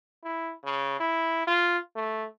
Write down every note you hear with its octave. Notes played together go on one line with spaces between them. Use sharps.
E4
C#3
E4
F4
A3